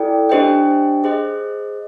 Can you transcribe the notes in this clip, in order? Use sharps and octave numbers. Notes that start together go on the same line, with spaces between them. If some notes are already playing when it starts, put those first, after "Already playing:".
Already playing: E4 A4 D5 G5
D4 G4 C5 D#5 G5
G#4 C5 D#5